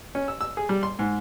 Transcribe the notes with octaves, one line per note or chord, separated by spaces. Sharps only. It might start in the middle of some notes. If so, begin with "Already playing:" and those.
C#4
E6
E6
G#4
G3
C6
G#2